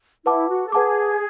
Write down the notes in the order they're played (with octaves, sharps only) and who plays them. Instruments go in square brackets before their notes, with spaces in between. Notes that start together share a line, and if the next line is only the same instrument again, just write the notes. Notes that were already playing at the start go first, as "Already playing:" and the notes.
[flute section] E4 [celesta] B4 F#5 A5 D6
[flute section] F#4
A4
[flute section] G#4 [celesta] B4 F#5 A5 D6